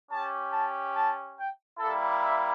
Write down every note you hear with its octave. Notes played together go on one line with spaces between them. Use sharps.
C#4 G4 A5
A5
A5
G5
G3 A#3 E4 A4
E5